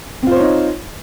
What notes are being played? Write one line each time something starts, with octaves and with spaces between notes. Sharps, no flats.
C4 D#4 F4 C5 C#5